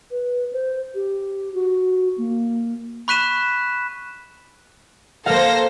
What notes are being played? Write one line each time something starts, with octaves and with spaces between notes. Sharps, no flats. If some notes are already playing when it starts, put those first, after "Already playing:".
B4
C5
G4
F#4
A#3
B5 C#6 F#6 B6 D#7 E7
A#3 A4 C5 F5 A#6